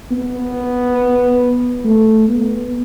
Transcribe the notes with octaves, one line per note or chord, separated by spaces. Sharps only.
B3
A3
B3